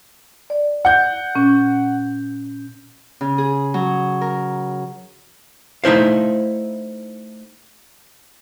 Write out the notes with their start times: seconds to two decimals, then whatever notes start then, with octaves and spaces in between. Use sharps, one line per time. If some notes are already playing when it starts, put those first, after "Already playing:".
0.50 D5
0.85 F#5 G6
1.35 A#2 C#4
3.21 C#3
3.38 G#4
3.74 F#3
4.21 A#4
5.84 A3 D#4 E4 C5 F5